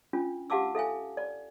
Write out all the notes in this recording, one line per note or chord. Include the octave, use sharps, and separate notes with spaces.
C#4 D4 F4
G4 F5 F#5 A5 D6 E6
A4 E5 F5 G#5
D5